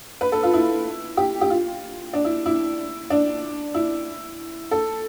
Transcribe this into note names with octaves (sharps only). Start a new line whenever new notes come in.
B4
A4
F4
E4
G4
G4
F4
D4
E4
E4
D4
E4
A4